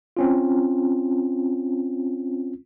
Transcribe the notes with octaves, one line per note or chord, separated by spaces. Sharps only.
C4 C#4 F4